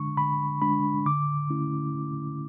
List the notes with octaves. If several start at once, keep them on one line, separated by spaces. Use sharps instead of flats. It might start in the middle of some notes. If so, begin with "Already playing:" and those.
Already playing: D3 G#3 D4 C#6
D3 B5
G#3 D4 B5
D3 D6
A3 C#4 E4
D3